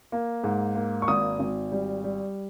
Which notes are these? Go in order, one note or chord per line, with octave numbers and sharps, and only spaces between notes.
A#3
G#2
A#3
C#6
G#1 D#6
G#1
G3
G3